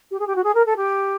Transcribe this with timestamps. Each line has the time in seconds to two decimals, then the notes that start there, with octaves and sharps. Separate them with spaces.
0.11 G4
0.19 G#4
0.27 G4
0.35 F#4
0.43 G#4
0.54 A#4
0.66 A4
0.76 G4